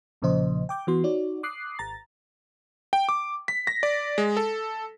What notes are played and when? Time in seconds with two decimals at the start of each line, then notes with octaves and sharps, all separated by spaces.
0.22 B1 A#2 C#3 F3 C5 D#5
0.69 G5 D6 G6
0.87 E3 B3 F#4 C6
1.04 D#4 F#4 C#5 D5
1.43 D6 D#6 F#6 C7
1.79 G#1 A#5 A6
2.93 G5
3.09 D6
3.48 B6
3.67 A#6
3.83 D5
4.18 G#3
4.37 A4